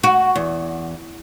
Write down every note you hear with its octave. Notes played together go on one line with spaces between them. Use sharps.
F#4
E2